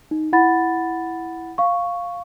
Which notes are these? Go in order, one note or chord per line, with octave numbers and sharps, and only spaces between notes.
D#4
E4 F#5 B5 A6
F5 C#6